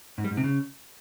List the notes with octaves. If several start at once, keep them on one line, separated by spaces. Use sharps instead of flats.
G#2
G3
G#2
C3
C#3